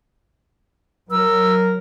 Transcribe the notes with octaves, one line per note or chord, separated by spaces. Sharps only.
F#3 A#4 E6